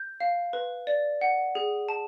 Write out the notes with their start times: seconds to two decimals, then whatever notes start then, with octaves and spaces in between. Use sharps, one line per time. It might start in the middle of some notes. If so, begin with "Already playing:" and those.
Already playing: G6
0.20 F5
0.53 B4
0.87 D5
1.21 F#5
1.55 G#4
1.89 A5